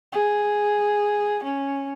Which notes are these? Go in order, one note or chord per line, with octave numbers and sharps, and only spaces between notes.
G#4
C#4